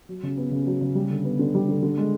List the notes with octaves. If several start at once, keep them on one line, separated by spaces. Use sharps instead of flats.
F#3
C#3
B3
C#3
F#3
C#3
G3
D3
B3
D3
G3
D3
D3
G#3